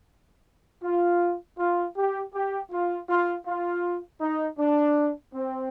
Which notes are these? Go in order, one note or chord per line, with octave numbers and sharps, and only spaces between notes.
F4
F4
G4
G4
F4
F4
F4
D#4
D4
C4